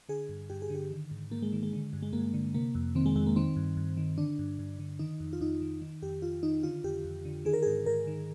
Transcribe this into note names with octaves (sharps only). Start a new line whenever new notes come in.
D3 G#4
G2
G2 G4
G#4
D3
G4
D#3
G#2
G#2 A#3
G#3
D#3
G#3
D3
G2
G#3
G2 A#3
D3
C3 A#3
F2
D#3 C4
G#3
F2 G#3
A#3
D#3 C4
G2
G2
D#3
D3 D4
G2
G2
D3
D#3 D#4
F2
F4
F2 D#4
D#3
D#3
F2 G4
F2 F4
D#3 D#4
D3 F4
F2 G4
F2
D3
D#3 G#4
A#4
G#2 G#4
G#2 A#4
D#3